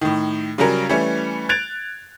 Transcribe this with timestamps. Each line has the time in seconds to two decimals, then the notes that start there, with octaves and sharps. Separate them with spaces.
0.01 A2 D#3
0.58 C#3 F#3 G3 C#4 A#4
0.89 E3 G3 A3 C#4
1.49 F#6 G#6 A6 D7 F7